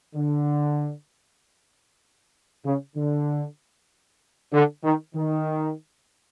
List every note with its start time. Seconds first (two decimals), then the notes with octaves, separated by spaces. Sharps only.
0.16 D3
2.65 C#3
2.96 D3
4.53 D3
4.84 D#3
5.15 D#3